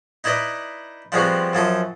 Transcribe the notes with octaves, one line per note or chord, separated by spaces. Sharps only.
D#4 E4 B4 D5 D#5
F3 G3 G#3 B3 C4 F#4
F#2 F3 A4 D#6